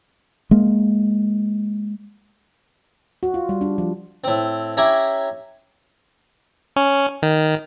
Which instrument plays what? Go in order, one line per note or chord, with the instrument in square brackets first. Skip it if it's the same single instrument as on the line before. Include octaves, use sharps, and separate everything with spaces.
[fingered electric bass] G#3 A#3
[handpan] F#4
F4
G3
D4
F3
[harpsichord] A2 C4
C#4 E4 G4 A#5 B5
[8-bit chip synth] C#4
D#3